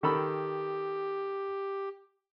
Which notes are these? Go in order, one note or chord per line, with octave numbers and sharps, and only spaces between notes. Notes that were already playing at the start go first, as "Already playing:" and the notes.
D#3 G4 A4 B5